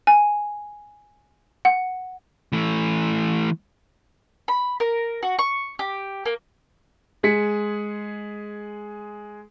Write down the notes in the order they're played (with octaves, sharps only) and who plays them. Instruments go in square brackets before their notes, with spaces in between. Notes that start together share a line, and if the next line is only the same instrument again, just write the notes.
[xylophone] G#5
F#5
[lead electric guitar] E3 A3
[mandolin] B5
A#4
F#4
C#6
G4
A#3
[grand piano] G#3 G#4 B6 C#7